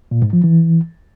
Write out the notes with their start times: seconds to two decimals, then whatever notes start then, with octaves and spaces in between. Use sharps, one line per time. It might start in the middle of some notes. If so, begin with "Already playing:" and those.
0.11 A#2
0.22 G#2
0.33 F3
0.44 E3